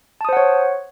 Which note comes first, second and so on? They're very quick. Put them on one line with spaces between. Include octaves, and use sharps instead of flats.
A5 D#6 C5 F#5 C#5